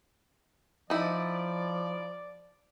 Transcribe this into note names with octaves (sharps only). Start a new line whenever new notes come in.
F3 D#4 E4 D5